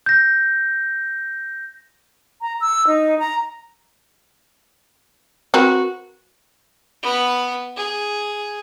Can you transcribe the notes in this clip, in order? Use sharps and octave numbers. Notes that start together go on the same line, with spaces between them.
G6 A#6
A#5
E6
D#4
A#5
C4 F#4 A#4 B4
B3 B5
G#4